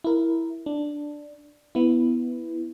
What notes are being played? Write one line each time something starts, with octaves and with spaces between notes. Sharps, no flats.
E4 A#4
D4
B3 E4